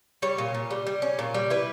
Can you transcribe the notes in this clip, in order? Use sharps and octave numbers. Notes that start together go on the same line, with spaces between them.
G3 C#5
A#2
A#2
G3
G3
C#4
A#2
G3
E4 B4